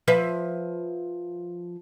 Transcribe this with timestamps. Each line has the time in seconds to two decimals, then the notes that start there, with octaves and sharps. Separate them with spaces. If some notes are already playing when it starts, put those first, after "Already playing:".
0.08 F3 B4 E5